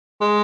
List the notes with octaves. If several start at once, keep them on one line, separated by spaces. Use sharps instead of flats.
G#3